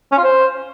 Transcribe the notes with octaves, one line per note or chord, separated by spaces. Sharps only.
C#4
F4
C5